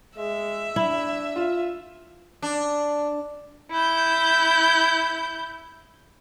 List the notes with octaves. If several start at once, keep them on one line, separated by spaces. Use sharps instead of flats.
G#3 E5
D4 E4
F4
D4
E4 G6